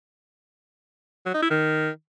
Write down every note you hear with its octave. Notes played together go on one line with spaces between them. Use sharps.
F#3
D#4
E4
D#3